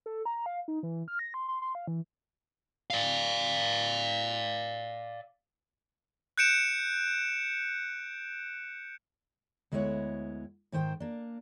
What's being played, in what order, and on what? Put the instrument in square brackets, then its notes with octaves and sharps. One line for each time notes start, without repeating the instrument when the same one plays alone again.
[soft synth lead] A4
A#5
F5
D#4
E3
F6
A#6
C6
C6
C6
F5
E3
[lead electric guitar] D5 F5
[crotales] F#6 G6 C#7 D7 E7
[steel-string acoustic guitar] D2 G#3 B3 E4 C#5 F#5
G#2 D#3 C5 G5
A#3 D4